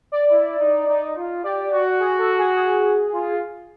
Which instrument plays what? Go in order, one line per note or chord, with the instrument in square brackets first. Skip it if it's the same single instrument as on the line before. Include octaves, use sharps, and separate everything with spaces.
[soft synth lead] D5
[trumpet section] E4
D#4
D#4
F4
[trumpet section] G4 [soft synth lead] D5
[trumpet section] F#4
[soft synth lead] G#4
A4
G#4
G#4
[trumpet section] F4